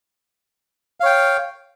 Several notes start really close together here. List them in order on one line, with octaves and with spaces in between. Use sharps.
F5 C#5 G5